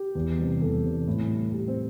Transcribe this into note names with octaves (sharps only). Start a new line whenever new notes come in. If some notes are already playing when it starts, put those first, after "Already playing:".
Already playing: G4
E2
C3 G3
E2 A4
C3 G3
A2
G3
A2 G4
C4